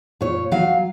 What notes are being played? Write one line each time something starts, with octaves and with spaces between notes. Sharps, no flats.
A#2 C#5
F#3 F5